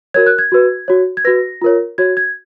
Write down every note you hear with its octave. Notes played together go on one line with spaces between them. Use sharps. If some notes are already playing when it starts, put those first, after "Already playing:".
F#4 A#4 C#5 G#6
F#6
G#6
F#4 B4
F#4 C#5
G#6
F#4 B4 A#6
F4 A#4 C#5
F#4 C#5 G#6
G#6